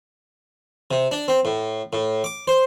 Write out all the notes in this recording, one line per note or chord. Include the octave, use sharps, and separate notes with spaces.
C3
D4
C4
A2
A2
D6
C5